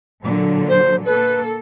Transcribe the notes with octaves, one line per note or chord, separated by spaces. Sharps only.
A#2 D3 F#3
C5
A#3 A4 B4